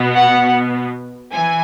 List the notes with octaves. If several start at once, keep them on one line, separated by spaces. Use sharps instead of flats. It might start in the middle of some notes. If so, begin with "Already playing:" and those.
Already playing: B2 B3
F#5
E3 G#5